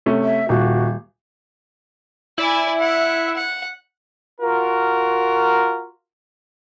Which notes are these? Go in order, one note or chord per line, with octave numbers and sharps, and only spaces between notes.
C3 A3 C#4
E5
D#1 F#4
E4 D5 G#5
F#5
F#5
F4 F#4 A#4